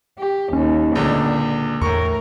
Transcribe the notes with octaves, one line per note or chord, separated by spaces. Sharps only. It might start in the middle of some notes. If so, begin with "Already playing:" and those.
G4
D#2 C#4
C#2 A#2 D3
E2 A2 A#4 C#6